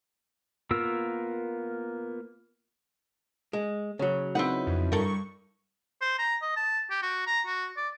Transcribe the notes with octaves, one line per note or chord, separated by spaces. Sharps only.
A#3 B3 F4 A#4 E6
G#3
C#3 F#3
C4 D#4 E4 B4 F#5
F2
G2 A4 A#4 C#6
C5
A#5
D#5
A5
G4
F#4
A#5
F#4
D5